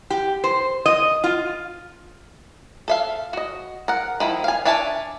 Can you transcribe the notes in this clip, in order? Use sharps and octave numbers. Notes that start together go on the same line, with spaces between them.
G4
C5
D#5
F4
A4 E5 F5
F#4 D#5
A#4 F#5
D#3 F3 E4
F5 G#5
D4 C#5 E5 G#5 A5